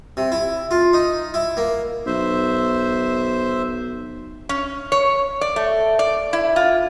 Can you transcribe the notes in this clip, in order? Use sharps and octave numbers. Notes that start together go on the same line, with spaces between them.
C3
E4
F4
D#4
E4
A#3
B1 C5 E5
C#4
C#5
D5
A3
D5
E4
F4